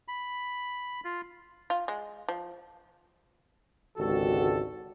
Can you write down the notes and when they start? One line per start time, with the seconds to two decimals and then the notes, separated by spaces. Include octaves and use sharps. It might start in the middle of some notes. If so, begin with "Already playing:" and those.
0.08 B5
1.04 F4
1.70 F4
1.88 G#3
2.28 F3
3.97 G#1 C#2 D3 F#4 G4 A4